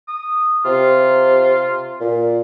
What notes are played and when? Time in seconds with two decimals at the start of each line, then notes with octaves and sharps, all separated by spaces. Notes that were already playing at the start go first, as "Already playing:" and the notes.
0.08 D#6
0.65 C3 F4
2.01 A#2